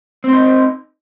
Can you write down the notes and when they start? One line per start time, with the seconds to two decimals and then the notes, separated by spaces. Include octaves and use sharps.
0.24 C4
0.28 C5
0.33 D#4